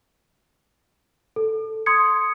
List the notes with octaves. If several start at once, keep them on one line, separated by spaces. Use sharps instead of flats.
A4
C6 D#6 G#6 C#7